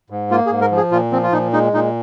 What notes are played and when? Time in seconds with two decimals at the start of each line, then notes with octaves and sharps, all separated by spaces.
0.10 G#2
0.31 A#3 F4
0.46 G#4
0.51 G#2
0.61 A#4
0.71 F3
0.77 G#4
0.91 A#2 F4
1.12 F3 C4
1.23 F4
1.32 A#2 D#4
1.53 G#3 D#4
1.74 A#2 D#4